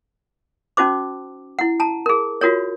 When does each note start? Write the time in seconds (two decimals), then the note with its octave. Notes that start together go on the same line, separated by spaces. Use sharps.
0.77 C#4 D#4 F#4 C5 D6
1.59 E4 F#5
1.80 A5 A#5
2.06 G#4 A#4
2.41 F4 F#4 A#4 C#5